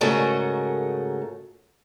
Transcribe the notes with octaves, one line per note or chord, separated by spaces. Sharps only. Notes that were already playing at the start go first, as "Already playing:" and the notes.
G#2 C#3 A3 F#4 A#4 D#5